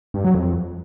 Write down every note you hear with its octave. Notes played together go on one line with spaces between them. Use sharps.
G2
F#3
F2